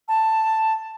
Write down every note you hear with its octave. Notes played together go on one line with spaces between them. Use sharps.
A5